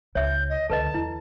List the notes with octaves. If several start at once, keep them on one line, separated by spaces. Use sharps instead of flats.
C#2 C#5 E5 G6
D#5
C#2 D3 A4 B4 D#5 A5
E2 E4